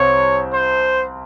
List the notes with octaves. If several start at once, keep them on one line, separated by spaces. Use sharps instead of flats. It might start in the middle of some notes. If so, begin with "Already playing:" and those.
Already playing: C2 C4 C#5
C5